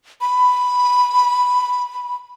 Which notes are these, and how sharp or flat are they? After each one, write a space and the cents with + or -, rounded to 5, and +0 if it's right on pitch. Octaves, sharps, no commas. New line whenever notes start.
B5 +0